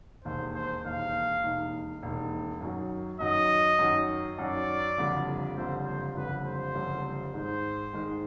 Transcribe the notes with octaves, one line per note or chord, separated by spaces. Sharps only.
E1 D#2 D#3 C5
C5
E1 D#2 D#3 F5
E1 D#2 D#3
E1 D#2 D#3
F#2 D#3 F#3
F#2 D#3 F#3 D#5
F#2 D#3 F#3
F#2 D#3 F#3 D5
F#1 F2 D3 G3
F#1 F2 D3 G3 C5
C5
F#1 F2 D3 G3 B4
C5
F#1 F2 D3 G3
G#2 D#3 G#3 C5
G#2 D#3 G#3